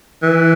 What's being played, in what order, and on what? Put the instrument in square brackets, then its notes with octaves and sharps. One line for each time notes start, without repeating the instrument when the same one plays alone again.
[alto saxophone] E3